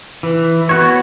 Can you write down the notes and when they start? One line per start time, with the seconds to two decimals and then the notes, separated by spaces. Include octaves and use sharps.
0.23 E3
0.69 B3 F#4 C#5